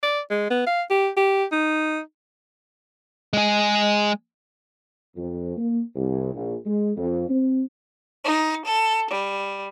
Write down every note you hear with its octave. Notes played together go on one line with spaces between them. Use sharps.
D5
G#3
B3
F5
G4
G4
D#4
G#3 G#4
F2
A#3
C2
A#1
G#3
F2
C4
D#4
A4
G3